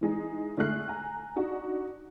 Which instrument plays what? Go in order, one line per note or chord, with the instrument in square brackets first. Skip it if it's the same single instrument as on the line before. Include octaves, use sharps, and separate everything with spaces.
[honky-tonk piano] E3 G#3 D#4
D3 G#3 A3 F6 F#6 C7
G#5 A#5
D4 D#4 F#4